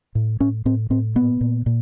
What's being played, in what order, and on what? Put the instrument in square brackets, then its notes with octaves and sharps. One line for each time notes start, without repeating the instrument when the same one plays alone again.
[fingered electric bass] A2
A2 C#4
A2 C4
A2 C4
A#2 B3
A#2
A#2